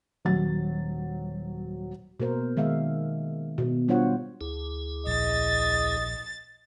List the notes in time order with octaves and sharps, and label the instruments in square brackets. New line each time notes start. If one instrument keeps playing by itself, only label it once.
[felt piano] D#1 F#3 A6
[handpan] B2 A#3 A#4 C5
D#3 G#3 E5 F5
B2
G3 D4 F4 C5 C#5 F#5
[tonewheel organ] D2 E4 G#4
[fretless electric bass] A#1 [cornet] D#5 [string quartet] A6